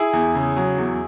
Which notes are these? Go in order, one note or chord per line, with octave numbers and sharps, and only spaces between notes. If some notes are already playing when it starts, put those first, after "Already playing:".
Already playing: E4 G#4
E2
C#3
F#3
E2